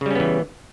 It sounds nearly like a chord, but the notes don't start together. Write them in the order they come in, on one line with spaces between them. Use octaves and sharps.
C#3 G3 C#4 B3 E3